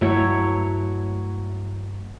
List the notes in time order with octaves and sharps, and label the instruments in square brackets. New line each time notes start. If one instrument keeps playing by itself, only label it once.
[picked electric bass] G2 A3 [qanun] F#3 E4 C#5